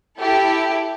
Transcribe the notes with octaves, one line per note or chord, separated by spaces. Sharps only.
E4 G4 A4